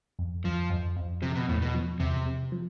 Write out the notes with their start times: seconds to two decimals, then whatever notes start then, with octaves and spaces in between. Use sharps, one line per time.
0.19 F2
0.44 F2 F3
0.70 F2
0.96 F2
1.22 C3 F3
1.35 B2
1.49 E2 A2
1.62 B2
1.74 F3
2.00 E2 C3
2.26 C3
2.52 F3